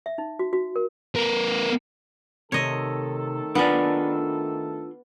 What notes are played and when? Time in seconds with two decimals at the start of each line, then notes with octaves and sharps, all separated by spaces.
0.06 E5
0.18 D#4
0.39 F#4
0.53 F#4
0.76 A#4
1.15 B3 A#4
2.52 C3 D#3 A3 A4 C#5 D#5
3.55 B3 D4 F4 D5 G#5